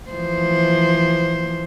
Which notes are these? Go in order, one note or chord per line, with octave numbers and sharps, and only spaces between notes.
E3 F3 C5